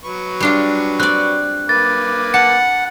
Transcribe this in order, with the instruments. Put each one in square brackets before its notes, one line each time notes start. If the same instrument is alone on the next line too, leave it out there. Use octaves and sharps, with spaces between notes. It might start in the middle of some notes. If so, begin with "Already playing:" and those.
[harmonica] F#3 B4 C#6
[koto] G3 D4 F4
[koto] C4 D5 [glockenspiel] F#6
[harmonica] A#3 B4 D6 [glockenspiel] A6
[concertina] F#5 [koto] A5 [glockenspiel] C#7